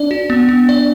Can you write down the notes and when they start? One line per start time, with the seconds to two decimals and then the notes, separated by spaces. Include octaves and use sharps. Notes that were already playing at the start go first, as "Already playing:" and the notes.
Already playing: D4 D5
0.11 F#4
0.30 B3
0.49 B3
0.69 D5